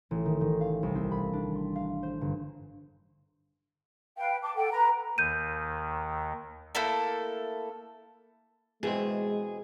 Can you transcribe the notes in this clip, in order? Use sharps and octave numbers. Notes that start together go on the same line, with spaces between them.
A1
D#3
D#3
F5
C2
C4
B5
D4
C6
F5
C5
G1
B4 F5 G5
A5 D6
A4 F#5 G5
B4 A#5
D#2 D#3 G6 D#7
A3 A#3 E4 A4
B2 E3 G#3 C4 G#4